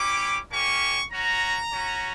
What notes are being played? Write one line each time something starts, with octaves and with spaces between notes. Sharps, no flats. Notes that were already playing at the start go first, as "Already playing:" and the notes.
Already playing: C#4 E4 G4 D6
A#3 C#4 G4 C#6
C#4 F#4 A#5
C#4 F#4